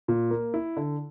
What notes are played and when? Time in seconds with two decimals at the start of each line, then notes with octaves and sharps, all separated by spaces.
0.08 A#2
0.31 A#3
0.54 E4
0.77 D3